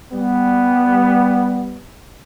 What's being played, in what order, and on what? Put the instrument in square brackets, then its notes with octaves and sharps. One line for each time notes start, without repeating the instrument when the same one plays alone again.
[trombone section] G3 B3